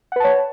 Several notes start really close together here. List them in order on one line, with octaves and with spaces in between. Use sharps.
F#5 B4 A5 C#5